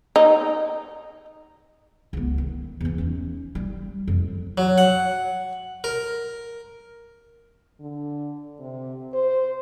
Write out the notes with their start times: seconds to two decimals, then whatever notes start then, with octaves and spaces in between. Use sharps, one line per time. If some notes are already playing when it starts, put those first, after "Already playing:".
0.16 D#4
2.13 C#2 B3
2.38 D#3
2.80 E2 E3
2.98 C#4 D#4
3.55 G3
4.07 F2
4.58 F#3
4.78 F#5
5.84 A#4
7.80 D3
8.60 C3
9.14 C5